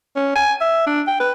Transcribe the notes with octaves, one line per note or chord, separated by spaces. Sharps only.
C#4
G#5
E5
D4
G5
B4